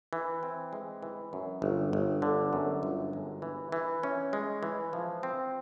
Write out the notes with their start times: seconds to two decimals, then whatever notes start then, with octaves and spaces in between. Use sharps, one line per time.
0.13 E3
0.43 C4
0.73 G#3
1.03 E3
1.33 F#2
1.62 G1
1.93 G1
2.22 D3
2.53 F#2
2.83 G1
3.13 G#3
3.42 E3
3.72 E3
4.03 C#4
4.33 G#3
4.63 E3
4.93 F3
5.23 C4